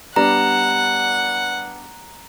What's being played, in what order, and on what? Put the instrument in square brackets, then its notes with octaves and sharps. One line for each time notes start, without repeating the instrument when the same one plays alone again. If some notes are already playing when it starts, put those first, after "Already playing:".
[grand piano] G3 B3 D4 [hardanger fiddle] F#5 [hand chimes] A#5